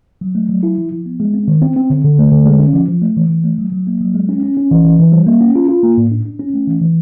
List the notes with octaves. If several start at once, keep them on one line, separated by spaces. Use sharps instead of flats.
F#3
A3
F#3
E4
F3
F3
B3
G#3
C4
D#3
C4
C4
D3
D3
A3
D3
G#3
C#4
F3
F3
A3
E3
E3
A3
F#3
F#3
A#3
F#3
G#3
C#4
C#4
C#4
E3
E3
E3
G3
A#3
C#4
F4
F4
A#3
A2
D4
D4
C#4
A3
E3
E3